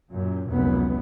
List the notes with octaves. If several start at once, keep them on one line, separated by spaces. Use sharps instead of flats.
F#2 A#2
F1 C#2 F#2 A#2 B3